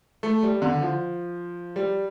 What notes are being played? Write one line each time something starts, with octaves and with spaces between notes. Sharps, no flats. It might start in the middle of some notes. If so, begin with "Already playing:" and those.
A3
G3
D3
F3
G3